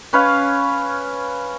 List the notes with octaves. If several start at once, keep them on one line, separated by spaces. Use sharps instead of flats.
C#4 B4 C#5 F5